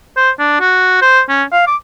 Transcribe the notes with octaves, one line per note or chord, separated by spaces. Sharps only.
C5
D4
F#4
C5
C#4
F5
D6